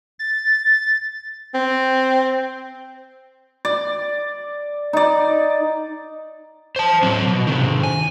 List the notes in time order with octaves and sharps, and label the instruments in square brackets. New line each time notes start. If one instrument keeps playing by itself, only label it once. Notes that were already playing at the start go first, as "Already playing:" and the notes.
[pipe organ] A6
[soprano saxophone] C4
[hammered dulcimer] D5
D#4 D5
[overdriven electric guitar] C5 A5
F#3 C4
B2
C3 D#3
G#5